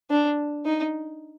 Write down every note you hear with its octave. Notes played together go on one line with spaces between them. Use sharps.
D4
D#4